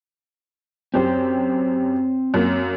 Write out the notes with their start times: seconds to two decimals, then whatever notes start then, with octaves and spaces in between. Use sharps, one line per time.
0.94 F#2 C4 G4 C5
2.34 F#2 A#3